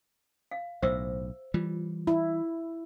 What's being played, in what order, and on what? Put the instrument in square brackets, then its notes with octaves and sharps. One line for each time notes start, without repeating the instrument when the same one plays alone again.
[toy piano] F5
[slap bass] B1 A2 [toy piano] C5 E5 E6
[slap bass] E3 G3 [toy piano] F4
[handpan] E4